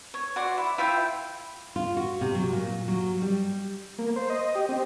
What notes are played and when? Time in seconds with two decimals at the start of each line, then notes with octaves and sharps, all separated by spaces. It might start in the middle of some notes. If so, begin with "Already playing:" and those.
0.14 C#5
0.36 F#4 D5 F#5 C6
0.58 E4
0.78 E4 F4 E5 G5
1.76 F4
1.97 F#4
2.21 C3
2.35 F#3
2.52 A#2
2.88 F#3
3.22 G3
3.99 A#3
4.16 C5
4.30 D#5
4.55 G4
4.69 C4